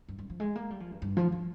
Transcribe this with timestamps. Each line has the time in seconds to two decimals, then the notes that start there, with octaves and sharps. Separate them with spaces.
0.08 G2
0.19 G2
0.30 F3
0.40 G#3
0.56 A#3
0.70 G3
0.80 F3
0.91 G2
1.02 G2
1.17 F3
1.32 F3